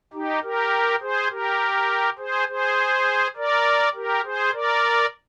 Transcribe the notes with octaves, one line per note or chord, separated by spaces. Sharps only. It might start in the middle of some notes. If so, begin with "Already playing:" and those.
D#4 G4
G4 A#4
G#4 C5
G4 A#4
G#4 C5
G#4 C5
A#4 D5
G4 A#4
G#4 C5
A#4 D5